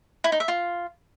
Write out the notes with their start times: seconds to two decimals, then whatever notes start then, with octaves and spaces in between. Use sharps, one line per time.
0.24 E4
0.32 D#4
0.40 E5
0.48 F4